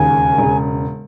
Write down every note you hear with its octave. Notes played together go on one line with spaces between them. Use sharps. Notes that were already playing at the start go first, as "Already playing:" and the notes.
Already playing: E1 D#2 C#3 G#5
E1 C#3